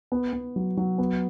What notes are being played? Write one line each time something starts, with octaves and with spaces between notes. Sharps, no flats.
B3
B3
F#3
F#3
B3